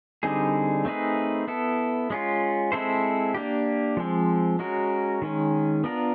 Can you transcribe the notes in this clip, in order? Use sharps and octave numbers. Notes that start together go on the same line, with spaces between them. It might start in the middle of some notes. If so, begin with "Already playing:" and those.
D3 G3 C4 D#4 G#4
A3 C4 D#4 G#4 B4
B3 E4 A4
G#3 C#4 F4
G#3 C4 E4 A4 C5
A#3 D4 G4
F3 G#3 C4
G#3 C#4 F#4 A#4
D#3 G#3 C#4
B3 D4 F4 A#4